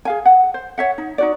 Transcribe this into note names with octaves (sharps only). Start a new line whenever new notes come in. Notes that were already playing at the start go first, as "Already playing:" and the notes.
G#4 F5 G#5
F#5
C5
C#5 E5 F#5
D#4
D#4 F#4 D5